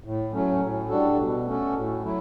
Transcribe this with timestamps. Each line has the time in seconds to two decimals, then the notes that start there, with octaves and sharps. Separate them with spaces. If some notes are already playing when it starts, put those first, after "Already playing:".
0.04 A2
0.33 F#3 A3 C#4
0.61 A2
0.89 G3 D4 F#4 A4
1.18 B2
1.46 A3 C#4 F#4 A4
1.74 A2
2.03 F#3 A3 E4